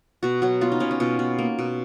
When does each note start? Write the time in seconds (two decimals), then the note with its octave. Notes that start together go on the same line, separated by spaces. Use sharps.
0.23 B2 F#4
0.42 F#3 F#4
0.61 B3 F4
0.72 D#4
0.80 B2 C#4
0.91 C#4
1.00 B2 F4
1.19 B2
1.38 A#3
1.59 B2